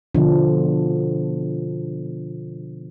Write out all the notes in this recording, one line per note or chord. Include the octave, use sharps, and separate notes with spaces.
B2 D3 F3 D4